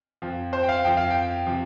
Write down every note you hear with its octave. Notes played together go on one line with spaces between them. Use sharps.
F2 F3
C5
G5
F5
F2 F3 G5
F5
G5
C3 F3